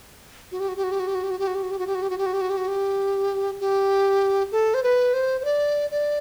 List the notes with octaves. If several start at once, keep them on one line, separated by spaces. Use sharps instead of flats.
F#4
G4
F#4
G4
F#4
G4
F#4
G4
F#4
G4
F#4
G4
F#4
G4
F#4
G4
F#4
G4
F#4
G4
F#4
G4
F#4
G4
F#4
G4
F#4
G4
G4
A4
C5
B4
C5
C5
D5
D5